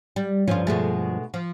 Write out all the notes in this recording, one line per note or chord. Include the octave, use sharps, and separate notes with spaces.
G3
D2 G2 F3 C#4 F4
B2 G#3 A3
F3